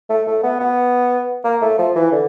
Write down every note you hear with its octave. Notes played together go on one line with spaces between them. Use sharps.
A3
A3
B3
B3
A#3
A3
F3
E3
D3